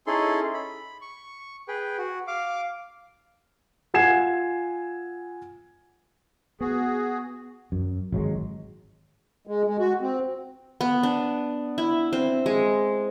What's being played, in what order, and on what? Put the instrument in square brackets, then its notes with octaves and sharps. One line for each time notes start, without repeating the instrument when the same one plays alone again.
[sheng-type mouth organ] C#4 D#4 E4 G#4 A4 C6
B5
C#6
G#4 B4 G5
F#4
F5 D6
[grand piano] F4 F#5 G#5 G#6 C7 E7
[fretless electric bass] B3 [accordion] F#4 G#4
[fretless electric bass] F#2
G#1 F#3 G#3
[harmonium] G#3
G#3
F#4
C4
[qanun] B3
D4
E4
C4
G#3